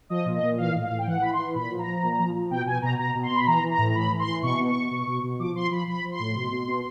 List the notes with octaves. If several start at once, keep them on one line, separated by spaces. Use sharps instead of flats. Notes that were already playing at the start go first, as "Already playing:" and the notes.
F3 D#5
A#2
D#5
A#2
E3 F5
A2
F5
A2
G5
E3 F#5
E3 B5
C6
E3
A#2 B5
F3
A#5
F3
A#2
F3
F3
B2 G5
B2 G#5
B2 A#5
B2 A#5
B2
C6
B2 B5
E3 A#5
E3
A#5
A2
A#5
E3 B5
E3
C6
E3
B2 C#6
B2
C#6
B2
B2
B2
B2
F3 D6
F3 C6
F3 B5
F3 B5
F3
C6
A2
B2
B2
B2